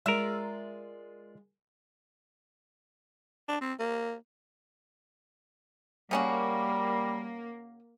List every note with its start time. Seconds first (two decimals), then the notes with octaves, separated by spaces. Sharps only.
0.06 G#3 F4 A#4 D5 E5
3.48 D4
3.61 C4
3.79 A#3
6.11 C#3 G3 A#3 C#4 F#4